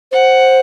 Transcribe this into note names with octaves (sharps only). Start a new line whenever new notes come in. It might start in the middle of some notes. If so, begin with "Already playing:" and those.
C5 F#5